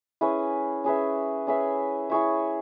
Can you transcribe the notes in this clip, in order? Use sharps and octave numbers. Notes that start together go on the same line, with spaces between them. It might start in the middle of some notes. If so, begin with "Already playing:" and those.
C#4 E4 G#4 B4
C#4 G#4 B4 E5
C#4 G#4 B4 E5
E4 G#4 C#5 E5